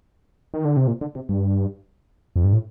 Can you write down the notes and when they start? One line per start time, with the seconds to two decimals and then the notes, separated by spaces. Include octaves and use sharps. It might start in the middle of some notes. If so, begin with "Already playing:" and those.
0.54 D#3
0.65 D3
0.77 C3
0.87 A#2
1.01 D3
1.15 C3
1.29 G2
2.36 F2
2.44 G2
2.53 A2